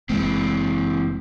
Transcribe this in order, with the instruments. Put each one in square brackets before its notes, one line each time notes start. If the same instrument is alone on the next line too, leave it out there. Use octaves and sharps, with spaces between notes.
[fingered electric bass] F#1 G#3 [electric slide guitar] E3 C4